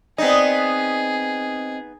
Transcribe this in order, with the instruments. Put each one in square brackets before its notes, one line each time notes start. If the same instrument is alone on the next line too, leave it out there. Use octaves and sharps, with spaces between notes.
[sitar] B3 D#4 [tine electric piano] C4 D#5 [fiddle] G#4 [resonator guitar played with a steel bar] D5